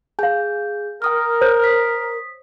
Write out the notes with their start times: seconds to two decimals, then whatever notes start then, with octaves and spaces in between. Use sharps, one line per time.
0.19 G#4 F5 G#5 G6
1.02 A#4 G5 D#6 F6
1.41 C5 C#5
1.64 D#6 B6